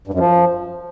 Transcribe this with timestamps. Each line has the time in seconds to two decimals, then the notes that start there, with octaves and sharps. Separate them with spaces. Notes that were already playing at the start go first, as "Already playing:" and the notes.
0.07 G2
0.13 F#2
0.19 F3